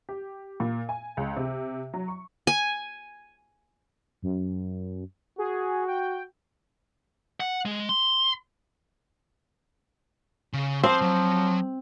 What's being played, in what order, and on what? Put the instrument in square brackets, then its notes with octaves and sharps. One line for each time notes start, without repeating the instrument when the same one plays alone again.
[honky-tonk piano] G4
A#2
G#5
C#2
C3
F#3
C#6
[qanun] G#5
[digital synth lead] F#2
[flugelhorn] F#4 [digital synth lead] G#4
[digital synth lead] G5
[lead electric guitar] F#5
G#3
C6
[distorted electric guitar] C#3
[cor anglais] F3 [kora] C4 [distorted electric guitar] C5 C6
[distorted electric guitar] F#3